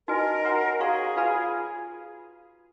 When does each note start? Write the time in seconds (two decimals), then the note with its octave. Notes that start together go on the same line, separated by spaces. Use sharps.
0.08 D#4 F#4 A#4 B4 D#5 G#5
0.44 F#4 C#5 F#5 A#5
0.80 F#4 G#4 C#5 F5 A#5 C#6
1.16 F4 B4 F5 G#5 B5